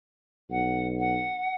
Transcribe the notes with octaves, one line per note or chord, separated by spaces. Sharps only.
B1 F#5
F#5